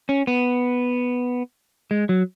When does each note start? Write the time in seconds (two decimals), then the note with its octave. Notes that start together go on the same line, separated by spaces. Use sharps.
0.09 C#4
0.27 B3
1.91 G#3
2.09 F#3